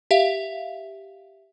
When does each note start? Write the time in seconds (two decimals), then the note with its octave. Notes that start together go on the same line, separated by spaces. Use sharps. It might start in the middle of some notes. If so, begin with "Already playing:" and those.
0.11 G4 E5 F5